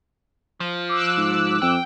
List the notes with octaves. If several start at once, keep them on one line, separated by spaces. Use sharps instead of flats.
F3
D6 E6 F#6
G#2
F2 G5